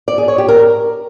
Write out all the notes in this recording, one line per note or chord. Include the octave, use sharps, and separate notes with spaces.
D5
G#4
C#5
G4
A#4